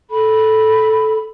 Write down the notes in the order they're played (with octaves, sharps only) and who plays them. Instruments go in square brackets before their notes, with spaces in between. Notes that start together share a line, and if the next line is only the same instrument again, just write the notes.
[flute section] A4 B5